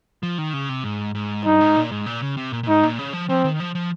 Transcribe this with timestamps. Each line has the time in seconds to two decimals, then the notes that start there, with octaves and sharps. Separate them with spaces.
0.23 F3
0.38 D#3
0.53 C#3
0.69 C3
0.84 G#2
1.15 G#2
1.45 G2 D#4
1.60 G#2
1.76 A#2
1.91 G#2
2.06 A#2
2.22 C#3
2.37 C3
2.52 A#2
2.63 A#2
2.68 G#2 D#4
2.83 A#2
2.99 C#3
3.13 F3
3.29 F3 C4
3.44 D#3
3.60 F3
3.75 F3